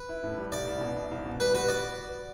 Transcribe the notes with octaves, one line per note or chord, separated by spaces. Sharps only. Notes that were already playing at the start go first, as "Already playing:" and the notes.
Already playing: B4
E4
A2
G3
C2 D5
C2
B2
C2
C2
B2
G3 B4
F#4 B4
F#4 D5